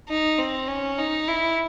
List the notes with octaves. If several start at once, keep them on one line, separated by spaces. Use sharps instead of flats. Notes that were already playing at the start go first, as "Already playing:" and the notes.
D#4
C4
C#4
D#4
E4